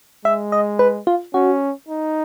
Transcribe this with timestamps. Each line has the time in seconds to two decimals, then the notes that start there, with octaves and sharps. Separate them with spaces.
0.25 G#3 E5
0.52 D#5
0.79 B4
1.07 F4
1.34 C#4 F#4
1.89 D#4